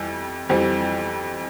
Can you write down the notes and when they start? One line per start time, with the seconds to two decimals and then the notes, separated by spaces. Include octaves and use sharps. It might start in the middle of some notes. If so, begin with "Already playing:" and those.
Already playing: F2 E3 G3
0.49 F2 E3 G3 C4